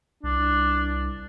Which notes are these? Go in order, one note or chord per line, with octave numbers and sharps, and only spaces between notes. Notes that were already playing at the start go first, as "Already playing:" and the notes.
C2 D4